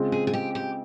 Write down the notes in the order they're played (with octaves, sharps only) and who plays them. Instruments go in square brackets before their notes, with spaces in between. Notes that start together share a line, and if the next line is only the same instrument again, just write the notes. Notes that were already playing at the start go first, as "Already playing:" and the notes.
Already playing: [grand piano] C#3 G#3 C4 F4
[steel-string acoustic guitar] G#4
G#4
G4
G4